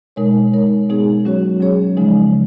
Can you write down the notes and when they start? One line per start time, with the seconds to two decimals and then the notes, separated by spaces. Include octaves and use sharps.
0.16 B2 G#3 D#4 A#4 C#5
0.53 G#3 D#4 A#4 C#5
0.89 B2 G#3 B3 D#4 G#4
1.25 F#3 C#4 F#4 C#5
1.61 F#3 C#4 G#4 C#5
1.97 C#3 F3 G#3 D#4